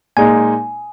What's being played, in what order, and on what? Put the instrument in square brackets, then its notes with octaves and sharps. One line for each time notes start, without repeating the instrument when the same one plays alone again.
[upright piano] A#2 G#3 D#4 [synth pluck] G#5